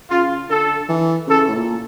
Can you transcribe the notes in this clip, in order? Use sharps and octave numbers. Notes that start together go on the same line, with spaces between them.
C#3 F4
D3 A4
E3
C#3 A4
A2
A#2